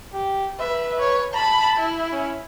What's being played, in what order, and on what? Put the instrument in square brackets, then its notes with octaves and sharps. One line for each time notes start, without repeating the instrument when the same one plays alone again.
[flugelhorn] G4
[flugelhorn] B4 [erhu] E5
[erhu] C#5
[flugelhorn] A5 [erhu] B5
[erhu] E4
[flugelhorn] C#4